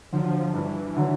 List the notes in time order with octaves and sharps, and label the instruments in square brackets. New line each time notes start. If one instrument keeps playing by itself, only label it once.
[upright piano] D3 F#3 [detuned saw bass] F3
[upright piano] G2 [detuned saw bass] E3
[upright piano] D3 F#3